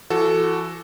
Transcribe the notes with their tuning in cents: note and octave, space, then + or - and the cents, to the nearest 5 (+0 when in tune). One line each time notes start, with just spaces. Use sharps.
E3 +40 F#4 +5 A4 +0